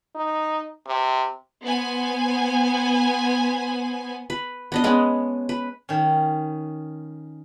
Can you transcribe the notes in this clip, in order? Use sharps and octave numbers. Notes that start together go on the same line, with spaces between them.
D#4
C3
B3 C5 G#5
B4
B3 D4 D#5
G#3 B3 C#4
B4
D#3 C#4